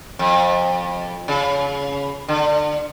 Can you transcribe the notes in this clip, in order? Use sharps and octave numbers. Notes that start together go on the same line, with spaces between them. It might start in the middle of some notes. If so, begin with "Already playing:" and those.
F2
C#3
D3